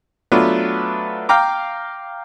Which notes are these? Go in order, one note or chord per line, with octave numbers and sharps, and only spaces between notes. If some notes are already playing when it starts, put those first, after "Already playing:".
F#3 A3 B3 D4 F4
F5 G5 A#5 D6